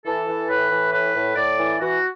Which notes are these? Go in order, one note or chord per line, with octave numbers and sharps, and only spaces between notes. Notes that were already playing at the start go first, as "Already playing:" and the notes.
E3 A4
E3
A2 B4
E3
A2 B4
A2
A2 D5
E3
E3 F#4